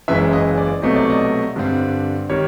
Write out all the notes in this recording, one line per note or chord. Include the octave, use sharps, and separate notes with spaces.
F#1 F#2 C#3 E3 G#3 E5
D#5
D5
C2 B2 F#3 A3 C4 D#5
D5
D#5
G2 D3 G3 C4
D#3 G3 C#5